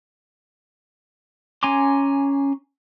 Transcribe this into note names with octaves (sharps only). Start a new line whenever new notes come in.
C#4 G#5 A#5 C6 D6